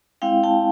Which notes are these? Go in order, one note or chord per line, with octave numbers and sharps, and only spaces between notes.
G#3 C4 E4 F5 G5
G5 A5